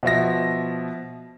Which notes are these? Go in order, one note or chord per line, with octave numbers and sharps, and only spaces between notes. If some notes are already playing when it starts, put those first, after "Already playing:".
B2 F3 E5 A#6